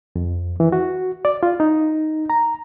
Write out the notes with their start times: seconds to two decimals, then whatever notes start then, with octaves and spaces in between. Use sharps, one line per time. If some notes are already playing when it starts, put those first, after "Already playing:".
0.16 F2
0.60 E3
0.72 F#4
1.25 D5
1.43 F4
1.60 D#4
2.30 A#5